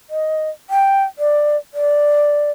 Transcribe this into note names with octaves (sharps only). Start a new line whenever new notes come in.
D#5
G5
D5
D5